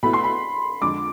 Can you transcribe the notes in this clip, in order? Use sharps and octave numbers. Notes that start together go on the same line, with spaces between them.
B2 A3 E4 B5
C6
B5
F2 D3 G#3 D4 D6